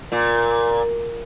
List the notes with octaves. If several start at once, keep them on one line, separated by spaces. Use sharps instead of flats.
A#2